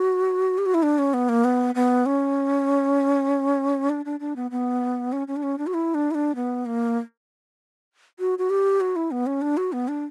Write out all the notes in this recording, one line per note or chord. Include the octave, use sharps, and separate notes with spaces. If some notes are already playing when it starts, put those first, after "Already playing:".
Already playing: F#4
G4
F#4
E4
D4
C#4
B3
A#3
B3
B3
C#4
D4
D4
D4
B3
B3
C#4
C#4
D4
C#4
D4
F#4
E4
D4
E4
D4
B3
A#3
F#4
F#4
G4
F#4
E4
B3
C#4
D4
F#4
B3
D4